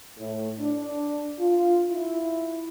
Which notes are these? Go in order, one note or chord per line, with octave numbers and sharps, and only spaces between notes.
A2
D4
F4
E4